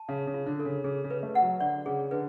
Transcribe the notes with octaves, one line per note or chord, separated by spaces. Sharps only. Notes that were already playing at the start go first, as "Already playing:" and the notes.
Already playing: A5
C#3 F5
C#3
F4
D3
A4
C#3
C#3 G#4
C#3
B4
A3
F#5
F#3
D3 D5
C#3 G#4
D3 B4